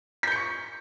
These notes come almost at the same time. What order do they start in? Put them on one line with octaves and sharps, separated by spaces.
B6 G6 C#7 C#6